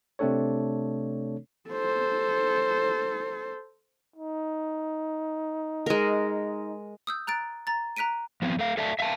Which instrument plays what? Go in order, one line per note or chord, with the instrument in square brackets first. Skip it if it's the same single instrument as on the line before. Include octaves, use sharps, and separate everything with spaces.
[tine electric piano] C3 A3 C4 D4 A4 C#5
[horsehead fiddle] A4 C5
[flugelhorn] D#4
[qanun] G#3 A#4
[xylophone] D#6 E6 G6
A#5 F#6 A6 D7
A#5 A6
A#5 F#6 B6 D7 D#7
[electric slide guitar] F3 B3 C4
A3 F5
A4 D5 E5 F5 A5
E5 F5 G5 A5